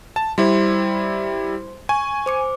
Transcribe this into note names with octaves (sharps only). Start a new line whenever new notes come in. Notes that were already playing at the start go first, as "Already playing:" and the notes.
A5
G3 E4 C5 C6
G#5 C#6
C5 D6 C#7